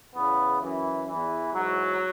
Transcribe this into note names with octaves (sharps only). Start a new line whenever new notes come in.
E2 C#3 E3 B3
F#2 E3
E2 E3
G#2 E3 F#3